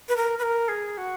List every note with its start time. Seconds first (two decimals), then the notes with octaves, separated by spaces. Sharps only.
0.09 B4
0.16 A#4
0.39 B4
0.43 A#4
0.68 G#4
0.97 F#4